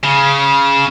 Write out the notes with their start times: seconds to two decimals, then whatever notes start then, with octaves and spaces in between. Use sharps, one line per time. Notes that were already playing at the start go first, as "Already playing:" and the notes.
0.03 C#3